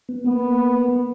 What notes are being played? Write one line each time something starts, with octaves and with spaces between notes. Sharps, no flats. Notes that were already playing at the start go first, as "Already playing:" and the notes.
B3
A#3 B3